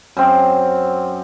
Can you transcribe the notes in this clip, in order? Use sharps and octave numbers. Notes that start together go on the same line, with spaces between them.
F#2 C4